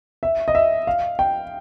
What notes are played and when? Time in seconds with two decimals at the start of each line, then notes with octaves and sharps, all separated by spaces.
0.23 E5
0.48 D#5
0.55 E5
0.87 F5
1.19 G5